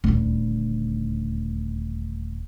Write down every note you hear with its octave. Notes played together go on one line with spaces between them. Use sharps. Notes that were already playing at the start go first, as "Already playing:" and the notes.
D#1 D2